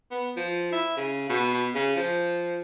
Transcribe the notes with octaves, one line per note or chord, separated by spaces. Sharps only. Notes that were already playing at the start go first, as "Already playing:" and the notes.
B3
F3
E4
C#3
B2
B2
C#3
F3